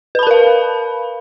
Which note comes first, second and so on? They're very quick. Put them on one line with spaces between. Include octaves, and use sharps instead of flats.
B4 B5 A5 A#4 F5